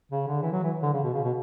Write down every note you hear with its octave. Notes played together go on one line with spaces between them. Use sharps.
C#3
D3
E3
F#3
E3
D3
C#3
B2
C#3
B2